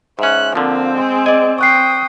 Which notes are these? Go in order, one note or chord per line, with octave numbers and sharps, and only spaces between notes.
G#2 C#4 E5 F#6
D3 F3 A#3 C4 F4
G#3 G#4
D5 D#5 G#5
G5 C#6 D#6 F#6 C7